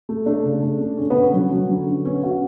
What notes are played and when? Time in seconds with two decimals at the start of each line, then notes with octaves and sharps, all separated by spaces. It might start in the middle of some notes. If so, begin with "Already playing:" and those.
0.09 A3
0.26 A3 D4
0.44 C#3
0.63 A3
0.81 A3
0.97 D3 C#4
1.10 B3
1.16 D3
1.21 C#4
1.34 F#3 C#4
1.52 F#3
1.69 D3
1.87 D3
2.05 B3 C#4
2.23 D3 F#4